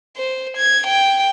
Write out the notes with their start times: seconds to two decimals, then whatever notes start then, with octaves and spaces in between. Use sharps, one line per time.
0.17 C5
0.57 G#6
0.87 G5